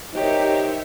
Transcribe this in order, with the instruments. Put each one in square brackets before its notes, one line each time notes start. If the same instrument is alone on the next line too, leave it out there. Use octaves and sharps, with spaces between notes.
[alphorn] D#4 [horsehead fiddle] G4 A#4 [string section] C5 C#5 E5